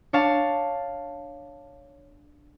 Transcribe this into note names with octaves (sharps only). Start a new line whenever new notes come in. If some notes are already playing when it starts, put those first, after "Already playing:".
D4 C#5 F5 A5